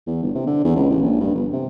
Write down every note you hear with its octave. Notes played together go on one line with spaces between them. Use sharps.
E2
G1
C3
D3
E2
C#2
A1
A#1
G2
G1
C3